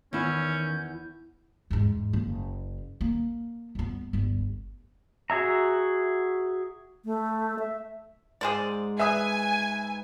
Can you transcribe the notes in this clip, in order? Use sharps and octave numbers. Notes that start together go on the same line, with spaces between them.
E2 D#3 C#4 E4 G6
E2 G#2
F#1
A#3
G1 B3
G1 D2
F#4 G#4 E5 A#5
A3
E5
G#2 G#4 C5 D5
B4 E5 G#5 D#6